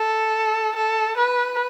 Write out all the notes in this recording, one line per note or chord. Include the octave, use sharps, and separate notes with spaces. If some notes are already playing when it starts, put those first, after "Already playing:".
Already playing: A4
A4
B4